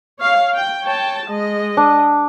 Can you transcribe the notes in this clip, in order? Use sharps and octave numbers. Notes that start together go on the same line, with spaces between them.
C#5 F5
G5
C#5 G5 A5
G#3 D#5
D4